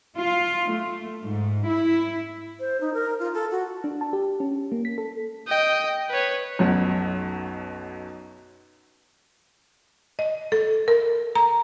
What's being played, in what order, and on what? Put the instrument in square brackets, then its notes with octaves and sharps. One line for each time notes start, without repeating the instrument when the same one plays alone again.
[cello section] F4
A3
G#2
E4
[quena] C5
D#4
A#4
F4
A4
F#4
[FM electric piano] D4
A5
G4
C#4
A#3
B6
A4
[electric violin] D#5 G5
B4 C#5
[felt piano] B1 F#2 B2
[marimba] D#5
A4
A#4
A#5